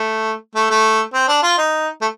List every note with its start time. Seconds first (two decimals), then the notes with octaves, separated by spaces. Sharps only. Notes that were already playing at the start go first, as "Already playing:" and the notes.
Already playing: A3
0.55 A3
0.70 A3
1.13 C4
1.28 D4
1.43 F4
1.58 D#4
2.01 A3